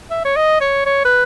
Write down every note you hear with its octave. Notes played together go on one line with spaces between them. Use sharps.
E5
C#5
D#5
C#5
C#5
B4